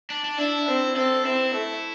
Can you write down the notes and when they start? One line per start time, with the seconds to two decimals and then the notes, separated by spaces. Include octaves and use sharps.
0.10 D4
0.24 D4
0.38 D4 E4
0.68 C4
0.96 C4 A4
1.25 C4 E4
1.54 A3